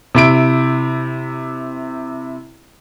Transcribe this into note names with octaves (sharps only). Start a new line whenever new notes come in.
C3 E4 D7